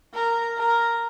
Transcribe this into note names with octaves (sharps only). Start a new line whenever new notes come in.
A#4
A#4